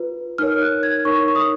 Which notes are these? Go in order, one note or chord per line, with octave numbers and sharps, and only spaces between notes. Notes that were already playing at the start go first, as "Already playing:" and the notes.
Already playing: F4 B4
D#4 A#4 C#5 F6
F#6
G#6
D#4 A#4 C#5 C#6
C#6
D#6